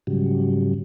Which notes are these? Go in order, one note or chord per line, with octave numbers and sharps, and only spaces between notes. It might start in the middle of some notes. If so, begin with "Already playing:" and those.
G#2 C#3 F#3 G3